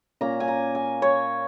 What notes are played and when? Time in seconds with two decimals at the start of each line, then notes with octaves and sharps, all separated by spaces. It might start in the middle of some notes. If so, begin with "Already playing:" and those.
0.21 A#2 A#3 C#4 A#5
0.40 G#5
0.48 A#5
0.75 G#5
1.02 C#5